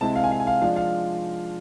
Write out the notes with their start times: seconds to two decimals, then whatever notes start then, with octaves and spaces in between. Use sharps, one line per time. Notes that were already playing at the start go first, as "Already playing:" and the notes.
0.01 C3 G#3 C4 E4 A5
0.16 F5
0.24 G#5
0.32 F5
0.40 G#5
0.47 F5
0.62 F3 G#3 D4 F5
0.76 F5